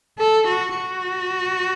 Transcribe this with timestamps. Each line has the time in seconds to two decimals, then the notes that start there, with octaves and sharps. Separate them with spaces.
0.19 A4
0.48 F#4
0.77 F#4